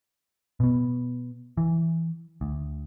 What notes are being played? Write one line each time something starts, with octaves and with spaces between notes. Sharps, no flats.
B2 B3
E3
D2